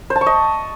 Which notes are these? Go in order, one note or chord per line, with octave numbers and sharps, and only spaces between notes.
C5
A5
C#6
D#5